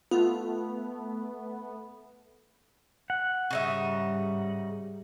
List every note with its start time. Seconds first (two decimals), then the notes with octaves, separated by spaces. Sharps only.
0.11 A3 B3 F4
3.10 F#5
3.51 G#2 C#3 G3 D#4 E5